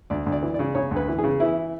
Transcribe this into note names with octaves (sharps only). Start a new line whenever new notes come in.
D2 D5
D2
D5
E3
D5
C#3
C#3 C#5
D2
B4
E3
G#4
C#3
E3 E4